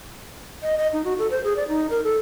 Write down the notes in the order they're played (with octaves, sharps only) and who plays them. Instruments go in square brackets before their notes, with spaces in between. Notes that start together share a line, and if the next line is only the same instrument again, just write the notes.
[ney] D#5
D#5
D#4
F#4
A4
C5
G#4
D5
D#4
A#4
A4